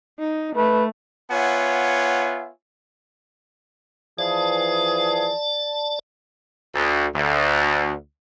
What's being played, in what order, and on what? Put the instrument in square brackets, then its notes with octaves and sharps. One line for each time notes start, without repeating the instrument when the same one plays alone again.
[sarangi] D#4
[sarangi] A3 [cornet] B4
[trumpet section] B3 F4 C#5 E5 F#5 G#5
[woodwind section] E3 F3 G#4 [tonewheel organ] D5 A5
[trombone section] D2
D2